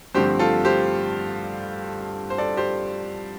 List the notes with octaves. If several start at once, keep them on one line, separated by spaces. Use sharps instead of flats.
G2 D3 F3 A3 C4 G4 C5
F4 A4
G4 C5
C5
A4 D5
G4 C5